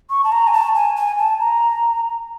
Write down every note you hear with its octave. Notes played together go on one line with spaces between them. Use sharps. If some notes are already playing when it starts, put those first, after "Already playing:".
C#6
A5
A#5
G#5
A5
G#5
G#5
A5
A#5